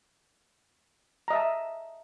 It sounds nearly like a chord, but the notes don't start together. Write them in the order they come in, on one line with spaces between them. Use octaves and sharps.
A#5 D#5 E5 A5